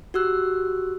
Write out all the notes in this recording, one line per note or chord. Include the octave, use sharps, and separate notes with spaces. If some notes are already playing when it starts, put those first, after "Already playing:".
F#4 G4 E6 F#6